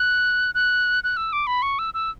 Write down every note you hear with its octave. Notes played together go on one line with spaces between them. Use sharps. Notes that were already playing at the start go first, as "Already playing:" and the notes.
Already playing: F#6
F#6
F#6
E6
D6
B5
C#6
E6
E6